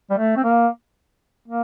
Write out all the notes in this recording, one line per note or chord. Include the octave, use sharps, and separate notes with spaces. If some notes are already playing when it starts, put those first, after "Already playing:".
G3
A3
C4
A#3
A#3